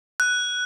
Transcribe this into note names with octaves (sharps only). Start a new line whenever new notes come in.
F#6